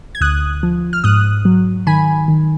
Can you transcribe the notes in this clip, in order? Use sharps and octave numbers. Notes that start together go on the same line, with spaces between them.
G#6
D2 D#6 F#6
F3
F6
G#2 D#6 F#6
F#3
D#3 G#5 B5
D#3